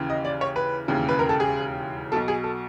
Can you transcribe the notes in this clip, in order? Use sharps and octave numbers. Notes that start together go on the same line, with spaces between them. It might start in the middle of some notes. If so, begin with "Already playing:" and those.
Already playing: D#2 C#3 E3
D#5
D5
C#5
B4
E1 D#2 C#3 E3
B4
A#4
A4
G#4
B1 B2 A4
G#4
A4